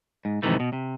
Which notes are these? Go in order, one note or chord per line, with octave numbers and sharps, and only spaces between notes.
G#2
F2 G#2 C3 D#3 E3 A3
B2
C3